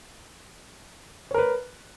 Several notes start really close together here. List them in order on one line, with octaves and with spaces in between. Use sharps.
C#5 A#4 B4